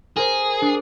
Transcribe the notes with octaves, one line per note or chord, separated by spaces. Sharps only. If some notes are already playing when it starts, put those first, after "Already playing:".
G#4 A#4 C5
D4